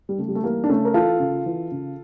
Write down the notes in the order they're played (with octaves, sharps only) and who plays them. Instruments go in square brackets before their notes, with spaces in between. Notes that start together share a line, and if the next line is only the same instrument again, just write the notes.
[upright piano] G3
C#3 A3
G3
A3
E3 G3 A#3
D4
C#3 A3 C#4
A#4
E3 F4 A4
C#3
E3
C#3